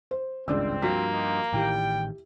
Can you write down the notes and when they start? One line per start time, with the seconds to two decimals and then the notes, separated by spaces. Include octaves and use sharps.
0.11 C5
0.48 G#1 C#2 G2 C4 D4 D5 E6
0.82 G2 F3 A#3 F#4 B6
1.12 D#4 F4 G4
1.53 A1 A2 D#3 G3 E4 G4 G5